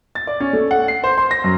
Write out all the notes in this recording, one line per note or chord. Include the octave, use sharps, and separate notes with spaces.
A6
D5
C#4
A3
F#5
C7
C5
C6
A#6
F#2